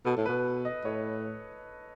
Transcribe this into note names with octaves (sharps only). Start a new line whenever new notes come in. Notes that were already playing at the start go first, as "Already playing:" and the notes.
B2 A4
A2
B2 B4
D#5
A2 C#5